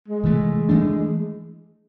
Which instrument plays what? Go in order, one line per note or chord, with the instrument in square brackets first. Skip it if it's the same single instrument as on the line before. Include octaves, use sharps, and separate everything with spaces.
[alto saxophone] G#3
[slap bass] C3 E3 A3
E3 A3 D4